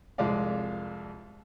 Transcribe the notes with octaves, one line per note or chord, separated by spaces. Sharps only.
C2 F2 G#3 F4 D5 F5